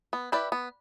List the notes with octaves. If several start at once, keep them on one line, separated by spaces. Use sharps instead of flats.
B3
E4 G4 B4 D5
B3